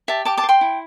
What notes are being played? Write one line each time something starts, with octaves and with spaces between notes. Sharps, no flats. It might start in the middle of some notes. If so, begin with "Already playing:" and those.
G4 E5 A5
G4 A5 D6
A5 D6
C5
G5 C6
E4